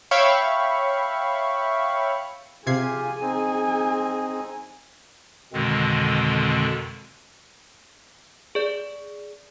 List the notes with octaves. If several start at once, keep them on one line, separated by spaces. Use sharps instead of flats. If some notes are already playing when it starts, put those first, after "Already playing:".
C#5 E5 F5 G5 B5 C#6
C3 F4 G4 G#4 G#5 G#6 C7
C4 D#4
F2 B2 D3 D#3 G#3 C4
G#4 D5